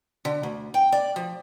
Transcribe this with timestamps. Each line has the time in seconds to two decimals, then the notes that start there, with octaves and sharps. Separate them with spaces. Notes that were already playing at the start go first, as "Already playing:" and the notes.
0.25 D3
0.43 D2
0.74 G5
0.92 D5
1.16 F3